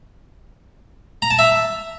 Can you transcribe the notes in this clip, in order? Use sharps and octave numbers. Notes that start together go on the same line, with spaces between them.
A#5
A5
E5